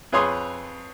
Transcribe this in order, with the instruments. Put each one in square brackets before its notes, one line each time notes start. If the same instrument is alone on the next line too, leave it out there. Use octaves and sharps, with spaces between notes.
[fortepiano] F2 G#4 B4 C#5 C6 D#6